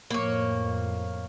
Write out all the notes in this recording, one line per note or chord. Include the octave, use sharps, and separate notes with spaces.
F2 A2 A#3 C#5